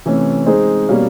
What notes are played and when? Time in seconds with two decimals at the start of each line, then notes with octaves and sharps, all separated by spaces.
0.06 C3 E3 A3 C#4
0.46 G#3 C4 D#4 G#4 C5
0.88 B2 G3 A#3 C#4